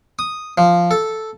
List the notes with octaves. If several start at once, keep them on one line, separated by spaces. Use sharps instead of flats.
D#6
F3
A4